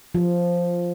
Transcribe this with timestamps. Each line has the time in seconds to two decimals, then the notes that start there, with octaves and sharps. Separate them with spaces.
0.15 F3